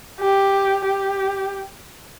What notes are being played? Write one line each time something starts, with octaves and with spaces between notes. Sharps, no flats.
G4
G4